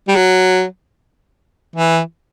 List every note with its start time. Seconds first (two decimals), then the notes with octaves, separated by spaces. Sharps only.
0.08 G3
0.16 F#3
1.76 E3